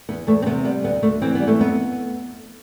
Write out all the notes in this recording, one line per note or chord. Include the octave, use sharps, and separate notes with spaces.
E2 B3
E2 A3
C4
C3 B3
G3 B3
D2 B3
D2 A3
E3 C4
G3 B3
A3
F2 B3